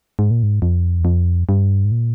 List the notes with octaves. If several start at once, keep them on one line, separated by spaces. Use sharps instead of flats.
G#2
A#2
G#2
F2
E2
F2
G2
G#2
A#2